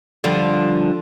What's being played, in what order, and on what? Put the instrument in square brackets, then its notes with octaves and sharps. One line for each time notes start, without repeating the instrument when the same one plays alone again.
[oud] D3 F3 G3